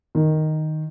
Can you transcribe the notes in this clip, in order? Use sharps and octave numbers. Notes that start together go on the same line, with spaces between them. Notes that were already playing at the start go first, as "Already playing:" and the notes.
D#3